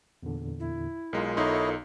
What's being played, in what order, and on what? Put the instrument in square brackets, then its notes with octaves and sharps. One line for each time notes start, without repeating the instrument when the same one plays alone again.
[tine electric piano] E2 A#2 D3
[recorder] E4
[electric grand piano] B1 G#3 [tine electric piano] F4 A#4
[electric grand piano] B1 D#4 C6 [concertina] E4 C#5 D#5 [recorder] A4